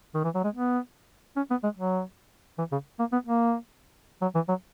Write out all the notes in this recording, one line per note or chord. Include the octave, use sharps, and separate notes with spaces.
D#3
E3
F#3
G#3
B3
C#4
B3
G#3
F#3
E3
C#3
A#3
B3
A#3
F#3
E3
F#3